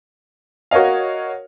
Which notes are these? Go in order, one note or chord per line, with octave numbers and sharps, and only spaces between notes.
F#4 A#4 C#5 D#5 F5